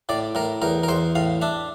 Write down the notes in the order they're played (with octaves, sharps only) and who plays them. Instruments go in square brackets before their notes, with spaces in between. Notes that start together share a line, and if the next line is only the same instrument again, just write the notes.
[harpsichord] A2 D5
A2 A#4
E2 A#4
A#4
E2 C5
A2 F5
D4 E5